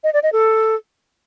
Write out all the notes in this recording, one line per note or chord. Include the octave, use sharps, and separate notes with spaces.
D#5
D5
D#5
A4